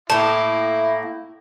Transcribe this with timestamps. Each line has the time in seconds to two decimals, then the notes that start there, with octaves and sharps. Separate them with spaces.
0.10 A2 A#3 E4 A5